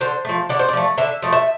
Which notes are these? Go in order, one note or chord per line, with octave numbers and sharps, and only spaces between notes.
D3 C5
F3 A3
D3 D5
C5
D5
F3 A3
D3 E5
F3 A3
E5